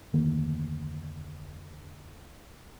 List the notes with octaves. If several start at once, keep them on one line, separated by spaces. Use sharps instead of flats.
F1 D2 D#3 A#3